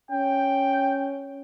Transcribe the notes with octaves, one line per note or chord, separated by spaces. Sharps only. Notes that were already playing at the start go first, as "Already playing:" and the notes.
C#4 G5